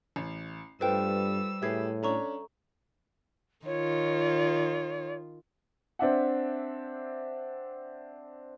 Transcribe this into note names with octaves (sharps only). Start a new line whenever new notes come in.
A1
G2 G3 A3 F4 B4 C5 G5 E6
A2 G4 G#4 B4 E5 G#6 C7
C#4 D4 A4 C#5 A#5 C#6
D#3 F4 C#5
C4 D4 E5 F#5